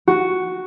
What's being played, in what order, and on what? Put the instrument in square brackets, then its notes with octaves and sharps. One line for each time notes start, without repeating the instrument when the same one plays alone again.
[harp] F#4